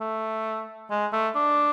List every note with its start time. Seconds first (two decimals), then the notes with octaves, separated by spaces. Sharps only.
0.01 A3
0.90 G#3
1.13 A3
1.35 D4